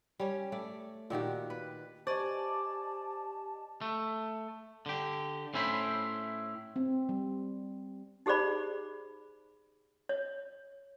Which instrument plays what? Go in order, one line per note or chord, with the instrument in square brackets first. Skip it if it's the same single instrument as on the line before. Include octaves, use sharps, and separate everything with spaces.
[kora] G3 C#4
A3 D5
A#2 D#3 F#4 G4
B4
[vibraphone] G4 D#5 G#5 [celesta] C5 C#6 G#6 [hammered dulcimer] D5 [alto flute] A5
[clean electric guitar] A3
D3 G4
A2 C#4 E4 C5 B5
[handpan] C4
G3
[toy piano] D#4 G4 G#4 C5 D5 B5
C#5